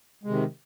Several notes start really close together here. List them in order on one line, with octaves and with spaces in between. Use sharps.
G#3 C3 D#3